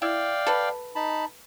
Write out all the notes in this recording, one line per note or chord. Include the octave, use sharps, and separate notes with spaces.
E4 D5 F5 G5
A4 B4
D#4 A5 B5